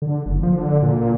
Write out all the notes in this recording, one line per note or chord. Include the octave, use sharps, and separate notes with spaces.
D3
F#1
F3
D3
A#2